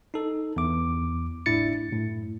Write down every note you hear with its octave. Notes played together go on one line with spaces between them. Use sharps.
D#4 A4
E2 D6
G1 A2 D4 E4 A6 C#7
F#2 A2